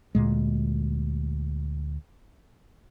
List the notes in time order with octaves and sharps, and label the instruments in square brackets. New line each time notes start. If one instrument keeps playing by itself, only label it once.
[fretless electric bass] D2 A#2 G#3